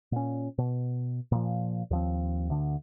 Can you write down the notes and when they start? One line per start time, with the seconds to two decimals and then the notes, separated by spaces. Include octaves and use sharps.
0.12 A#2 C#4
0.58 B2
1.32 A#2 F3
1.91 D#2 F3 C4
2.50 D2 D3